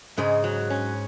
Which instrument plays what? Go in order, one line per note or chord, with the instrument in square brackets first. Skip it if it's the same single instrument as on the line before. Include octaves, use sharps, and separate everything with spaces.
[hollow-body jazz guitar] G#2 G#3 [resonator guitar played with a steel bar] C#3
[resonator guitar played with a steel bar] F#3
C#4